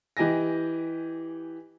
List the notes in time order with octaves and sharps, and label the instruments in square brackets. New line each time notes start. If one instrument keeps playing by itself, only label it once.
[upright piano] E3 G4 D#5 G#5 A#6